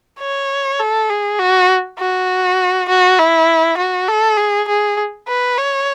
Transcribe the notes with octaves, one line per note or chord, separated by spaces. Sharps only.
C#5
A4
G#4
F#4
F#4
F#4
E4
F#4
A4
G#4
G#4
B4
C#5